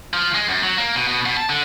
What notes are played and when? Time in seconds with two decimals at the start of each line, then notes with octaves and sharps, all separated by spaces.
0.14 F3
0.34 G#3
0.49 F#2
0.63 F#3
0.78 A#3
0.95 B2
1.08 B2
1.26 B2
1.37 A5
1.49 D3